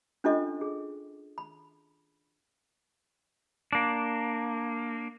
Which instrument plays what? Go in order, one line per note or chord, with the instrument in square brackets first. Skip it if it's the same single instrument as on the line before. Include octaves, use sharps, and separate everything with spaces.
[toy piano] C#4 D4 F4 A4 D#5 C#6
G#4
B5
[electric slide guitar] A#3 D4